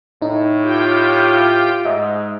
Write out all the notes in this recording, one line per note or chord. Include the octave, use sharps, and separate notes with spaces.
A2 D#4
F4 G4 G5
G#2 D#5 E5